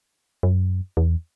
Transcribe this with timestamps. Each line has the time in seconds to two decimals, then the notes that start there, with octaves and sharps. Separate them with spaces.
0.43 F#2
0.97 E2